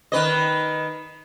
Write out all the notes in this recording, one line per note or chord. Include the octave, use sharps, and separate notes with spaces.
D#3 B4 D#5